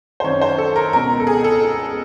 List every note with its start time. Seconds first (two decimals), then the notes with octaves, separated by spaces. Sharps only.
0.20 C5
0.24 F#2 D#3 C#5
0.41 C5
0.58 A4
0.76 A#4
0.93 C#2 B2 A#4
1.20 A4
1.27 G#4
1.44 A4